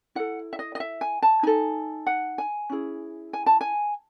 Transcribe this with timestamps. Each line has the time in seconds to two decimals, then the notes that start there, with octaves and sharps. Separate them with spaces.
0.15 E4 A4 F#5
0.53 E5
0.59 D#5
0.75 D#5
0.80 E5
1.01 G#5
1.22 A5
1.43 D#4 A4 G#5
2.07 F#5
2.38 G#5
2.70 C#4 E4 G#4
3.33 G#5
3.46 A5
3.61 G#5